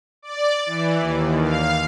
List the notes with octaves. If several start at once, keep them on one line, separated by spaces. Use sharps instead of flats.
D5
E3
D#2
F5